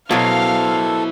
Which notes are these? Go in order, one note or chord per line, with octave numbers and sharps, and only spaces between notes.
B2 F#3 E4 A4 C5 F5